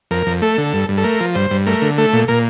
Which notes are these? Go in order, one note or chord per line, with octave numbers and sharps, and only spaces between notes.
F2 A#4
F2
A3 A4
D3
G2
G2
A4
A3 A#4
F3
G2 C5
G2
A3 A#4
D3
A3 A4
A#2
A#2 A#4